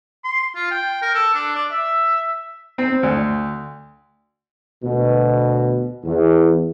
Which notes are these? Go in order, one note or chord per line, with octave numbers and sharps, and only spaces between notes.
C6
F4
G5
A#4
A4
D4
D5
E5
C4
D2
D2 B2
E2